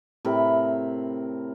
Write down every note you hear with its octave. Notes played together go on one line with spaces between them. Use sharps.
A2 C3 A#4 B5